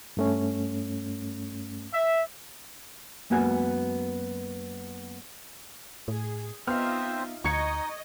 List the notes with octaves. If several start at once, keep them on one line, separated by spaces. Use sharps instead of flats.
G2 A3 C#4
E5
F#2 G#3 A#3 B3 F#4 G#5
A2 G#4
B3 C4 D#4 F4 C5 E5 F5 F6
D2 D#4 D#5 C#6 G#6 C#7